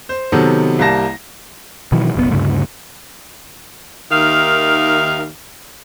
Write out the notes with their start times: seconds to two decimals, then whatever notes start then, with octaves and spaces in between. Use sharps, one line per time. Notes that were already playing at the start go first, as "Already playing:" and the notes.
0.09 C5
0.32 C3 D#3 F#3 B3 A4
0.79 C2 G3 A#3 A5 A#6
1.92 B2 D#3 E3 F#3
2.15 F#1 B1 A2 B3
2.31 D2 G2 C#3 A3
4.12 D#2 D#3 E5 F5